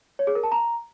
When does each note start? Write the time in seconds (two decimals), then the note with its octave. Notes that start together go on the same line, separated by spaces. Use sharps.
0.19 C#5
0.27 G#4
0.35 A#4
0.43 A5
0.52 A#5